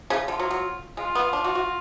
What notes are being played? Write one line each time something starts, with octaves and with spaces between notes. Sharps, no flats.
C#3
D3 F4
F#3
F#3
G#3 F4
B3
D4
F#4
F#4